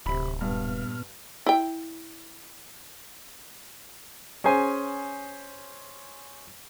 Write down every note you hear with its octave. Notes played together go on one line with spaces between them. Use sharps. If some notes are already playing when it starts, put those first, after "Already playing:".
D1 C3 B5
G2 A#2 B3 F6
E4 G5
C#4 G#4 C5 G#5